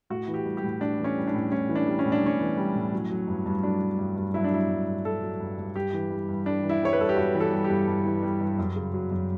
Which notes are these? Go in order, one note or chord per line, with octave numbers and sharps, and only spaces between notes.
A2 F#4
E3
G4
G3
G4
A2
A2 D4
E3
C#4
G3
D4
A2
A2 C#4
E3
D4
G3
C#4
A2
D4
A2 C#4
E3
G3
A2
F#3
F#3
G2
G2
F#3 D4
F#3
G2
G2
F#3 E4
D4
F#3 E4
G2
G2
F#3 A4
F#3
G2
G2
G2 G4
E3
G3
G2
G2 D4
E3
E4
G3 C#5
B4
G2 A4
G4
G2 F#4
E3
A4
G3
G4
G2
G2
E3
G3
G2
F#2
C#3
F#3
F#2